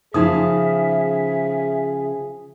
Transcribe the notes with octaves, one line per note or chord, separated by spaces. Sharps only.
C#3 F3 D#4 G#4 E5 D#6